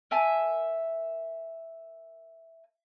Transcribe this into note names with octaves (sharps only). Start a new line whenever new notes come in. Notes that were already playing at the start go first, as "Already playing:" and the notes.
A#4 E5 G#5 A5